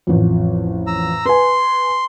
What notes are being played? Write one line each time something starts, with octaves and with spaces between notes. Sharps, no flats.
A1 F2
A#5 E6
B4 G#5 C6